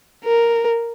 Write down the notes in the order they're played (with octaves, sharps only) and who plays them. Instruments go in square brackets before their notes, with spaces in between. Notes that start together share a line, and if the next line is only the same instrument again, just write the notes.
[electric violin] A#4